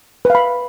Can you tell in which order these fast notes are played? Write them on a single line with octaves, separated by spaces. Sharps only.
B4 F5 B5